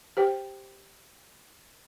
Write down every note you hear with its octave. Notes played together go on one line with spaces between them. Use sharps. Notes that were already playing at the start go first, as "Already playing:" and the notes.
G4 C5 G5